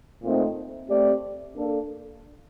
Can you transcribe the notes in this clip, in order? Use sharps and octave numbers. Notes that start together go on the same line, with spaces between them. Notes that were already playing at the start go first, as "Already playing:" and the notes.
A#2 A3 C4 D#4
A3 C4 G4 D5
A#3 D4 A4